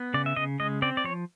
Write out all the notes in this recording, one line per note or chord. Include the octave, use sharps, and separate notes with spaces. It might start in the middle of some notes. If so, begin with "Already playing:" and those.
Already playing: B3
C#3 D5
E5
C#3 D#5
G#3 D#5
C4 D5
D5
F3 C#5